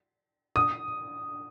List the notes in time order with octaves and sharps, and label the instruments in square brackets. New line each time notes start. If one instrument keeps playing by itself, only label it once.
[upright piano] D#6